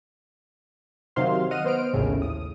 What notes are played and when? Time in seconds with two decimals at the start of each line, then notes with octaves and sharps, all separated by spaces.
1.16 C3 D#3 F#3 C5 F5 C6
1.51 D#5 F#5 F6 D#7
1.65 B3 C5 F6 D7
1.93 A#1 D#2 A2 C#3
2.22 D#6